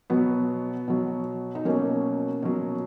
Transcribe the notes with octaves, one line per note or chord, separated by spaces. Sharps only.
B2 F#3 B3
B2 F#3
D#4
B2 F#3 A#3 C#4
B2 F#3